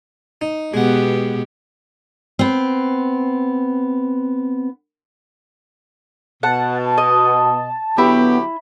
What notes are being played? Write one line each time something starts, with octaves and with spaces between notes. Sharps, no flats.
D#4
B2 G#3 B3 G4 F#5
B3 C4
B2 F#5 A5
D#5
D3 F#3 B3 E4 G4